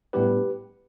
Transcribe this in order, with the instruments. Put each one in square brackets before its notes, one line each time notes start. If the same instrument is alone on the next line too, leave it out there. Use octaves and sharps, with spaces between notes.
[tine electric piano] A2 G3 B3 D4 G4 B4